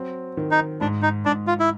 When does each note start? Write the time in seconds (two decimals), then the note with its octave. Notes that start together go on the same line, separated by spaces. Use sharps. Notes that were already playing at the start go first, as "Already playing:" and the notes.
Already playing: F#3 C4
0.37 D#3
0.51 D#4
0.81 G#2 D4
1.02 D#4
1.25 G#2 D4
1.47 F4
1.60 E4